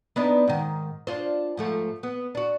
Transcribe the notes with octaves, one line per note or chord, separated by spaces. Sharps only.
B3 D4 D#4
G#2 D#3
D4 F4 C5
G#2 F3 A3
B3
D4 F#4